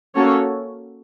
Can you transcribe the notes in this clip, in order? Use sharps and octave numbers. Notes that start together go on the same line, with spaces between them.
A#3 C#4 F#4 A4 C#5